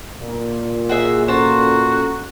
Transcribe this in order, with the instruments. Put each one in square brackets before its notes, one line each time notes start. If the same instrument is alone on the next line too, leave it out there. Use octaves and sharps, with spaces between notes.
[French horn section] A#2
[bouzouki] F#4 G#4 E5
[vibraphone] C#4 A4 A#5 [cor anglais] F#4 [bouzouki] C5 A5